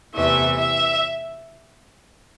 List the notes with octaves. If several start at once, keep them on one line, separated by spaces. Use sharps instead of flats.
E2 C3 E3 A3 E5
E5